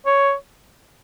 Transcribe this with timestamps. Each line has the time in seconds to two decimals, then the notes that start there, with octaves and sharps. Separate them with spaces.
0.06 C#5